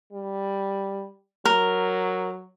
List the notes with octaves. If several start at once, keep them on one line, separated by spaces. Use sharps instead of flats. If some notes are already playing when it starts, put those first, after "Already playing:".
G3
F#3 A#4